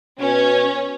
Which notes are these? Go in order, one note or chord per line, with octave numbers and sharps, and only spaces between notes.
B2 C#4